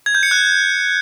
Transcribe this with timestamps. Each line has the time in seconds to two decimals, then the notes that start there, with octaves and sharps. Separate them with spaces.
0.06 G#6
0.15 G6
0.23 C#7
0.31 F#6